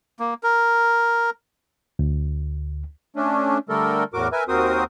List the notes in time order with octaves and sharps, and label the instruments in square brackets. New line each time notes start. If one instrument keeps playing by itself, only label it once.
[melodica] A#3
A#4
[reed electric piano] D2
[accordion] A3 C#4 D4
D3 G3 A3 A4 A#4
E2 A2 F#4 A#4 D6
A#4 B4 E5 G#5
D#2 C4 F#4 A#4 C5 D#6